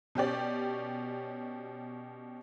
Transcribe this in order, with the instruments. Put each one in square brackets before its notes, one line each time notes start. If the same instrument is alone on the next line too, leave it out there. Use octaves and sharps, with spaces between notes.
[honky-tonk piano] B2 C#4 G4 D5